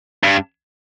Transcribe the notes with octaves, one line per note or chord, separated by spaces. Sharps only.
G2